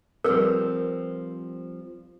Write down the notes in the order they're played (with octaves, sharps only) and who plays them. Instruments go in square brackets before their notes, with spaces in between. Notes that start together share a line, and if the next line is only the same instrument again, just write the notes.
[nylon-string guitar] F3 G3 C4 [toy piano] A#4 B4